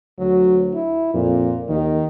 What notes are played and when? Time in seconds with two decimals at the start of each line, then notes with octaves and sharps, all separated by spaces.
0.19 D2 F#3
0.74 E4
1.14 F2 A#2
1.69 D#2 D#3